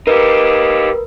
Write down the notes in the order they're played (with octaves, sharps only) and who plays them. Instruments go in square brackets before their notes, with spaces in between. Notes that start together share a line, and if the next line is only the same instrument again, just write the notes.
[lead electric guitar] D#4 G4 [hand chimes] A#4 B4